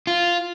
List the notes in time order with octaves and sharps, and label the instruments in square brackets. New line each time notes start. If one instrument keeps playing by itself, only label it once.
[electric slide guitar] F4